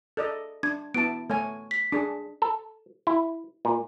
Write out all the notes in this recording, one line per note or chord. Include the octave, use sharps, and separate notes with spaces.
A4 D5 D#5
D4 G#6
B3 E4 A5 D7
A3 C#5 G#5
B6
D4 G#4
A4
E4
A#2